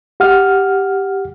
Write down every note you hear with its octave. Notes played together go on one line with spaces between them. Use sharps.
G4 F#5 F6